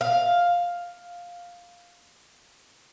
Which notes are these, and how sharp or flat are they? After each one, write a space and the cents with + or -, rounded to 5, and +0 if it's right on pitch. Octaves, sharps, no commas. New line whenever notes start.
F5 +5